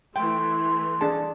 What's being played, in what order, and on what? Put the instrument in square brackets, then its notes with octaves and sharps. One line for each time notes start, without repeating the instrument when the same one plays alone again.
[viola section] E3 A3 [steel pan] G5 [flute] C6
[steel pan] D4 G#4 A5